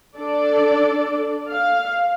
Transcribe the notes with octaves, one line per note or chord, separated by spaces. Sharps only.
D4 A4 D5
F5